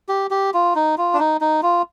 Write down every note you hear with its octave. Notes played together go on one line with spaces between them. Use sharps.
G4
G4
F4
D#4
F4
D4
D#4
D#4
F4